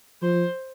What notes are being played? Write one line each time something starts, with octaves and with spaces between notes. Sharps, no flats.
F3 C5